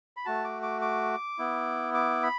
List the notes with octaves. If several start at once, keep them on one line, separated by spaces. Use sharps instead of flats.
B5
A3 F#4 A5
D6
D6
D6
B3 E4
D6
B5